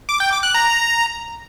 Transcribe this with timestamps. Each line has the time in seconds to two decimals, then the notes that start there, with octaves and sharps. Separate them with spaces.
0.09 D6
0.20 G5
0.32 D6
0.43 F#6
0.55 A#5